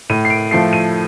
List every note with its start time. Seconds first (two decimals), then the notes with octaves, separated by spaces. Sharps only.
0.10 A2 D#7
0.25 C7
0.30 D7
0.51 F3 A3 C7
0.73 D#7